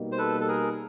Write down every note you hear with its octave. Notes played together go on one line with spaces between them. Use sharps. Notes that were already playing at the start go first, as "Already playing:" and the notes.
Already playing: B2 G3 A#3 D#4 G4
C5
A4 B4
A4
G#4 A#4